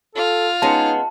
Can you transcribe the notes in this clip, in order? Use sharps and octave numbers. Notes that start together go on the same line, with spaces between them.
F4 A4 F6
G#3 B3 C#4 D#4 A5